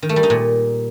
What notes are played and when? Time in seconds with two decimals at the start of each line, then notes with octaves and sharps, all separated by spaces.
0.03 D#3
0.09 A3
0.16 G3
0.23 D#4
0.30 A#2